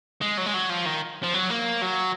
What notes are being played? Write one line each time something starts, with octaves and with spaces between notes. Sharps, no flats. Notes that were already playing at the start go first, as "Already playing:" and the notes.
G#3
F#3
G#3
F#3
F3
D#3
F3
F#3
A#3
F#3